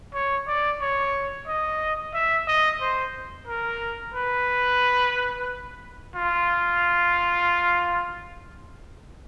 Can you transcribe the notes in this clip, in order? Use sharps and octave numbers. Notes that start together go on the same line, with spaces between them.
C#5
D5
C#5
D#5
E5
D#5
C5
A#4
B4
F4